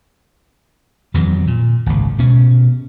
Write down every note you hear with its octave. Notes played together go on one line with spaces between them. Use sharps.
F2 D#3 E3 F#3
A#2
G#1 C#2
B2 C#4